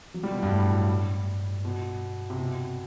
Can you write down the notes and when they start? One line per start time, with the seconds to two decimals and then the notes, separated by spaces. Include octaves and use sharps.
0.14 F#3
0.23 G3
0.32 B2
0.43 G2
0.52 A2
1.65 B2
2.30 C3
2.39 B2